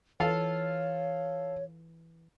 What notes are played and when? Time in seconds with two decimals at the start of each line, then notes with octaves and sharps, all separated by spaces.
0.20 E3 F4 A4 C#5 F5